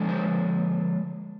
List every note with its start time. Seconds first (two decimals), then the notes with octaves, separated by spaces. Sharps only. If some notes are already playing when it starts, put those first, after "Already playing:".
Already playing: D3 F3 G#3 D4
0.09 C5